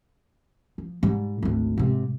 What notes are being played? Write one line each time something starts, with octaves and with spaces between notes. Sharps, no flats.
F3
G#2 G3
G#1 D2
G#2 C3